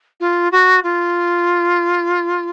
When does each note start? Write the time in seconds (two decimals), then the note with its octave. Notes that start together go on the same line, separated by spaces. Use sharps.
0.20 F4
0.52 F#4
0.84 F4